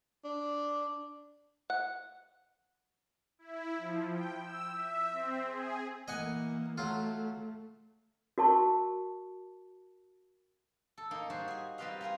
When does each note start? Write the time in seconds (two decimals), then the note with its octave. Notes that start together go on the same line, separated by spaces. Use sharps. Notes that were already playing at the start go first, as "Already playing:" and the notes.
0.24 D4
1.70 F#5
3.39 E4
3.77 F3
4.11 G5
4.40 E6
4.72 E5
5.10 C4
5.44 G#4
6.08 E3 A#3 D#5 F#5 G#5
6.78 F#3 A3 F4
8.38 F#4 A#4 A5 C#6
10.98 A4
11.11 A#3 D#4
11.30 G3 D#4 F#4 G#4 C5
11.48 G#4 G#5
11.78 G3 C4 F4 B4 D#5 F5
12.01 F4 A#4 F5 G#5